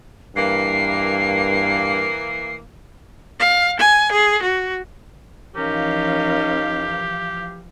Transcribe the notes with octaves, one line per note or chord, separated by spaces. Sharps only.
G2 E3 A#3 C7
F5
G#5
G#4
F#4
E3 F3 C#4 D#4 G4 A#4 F5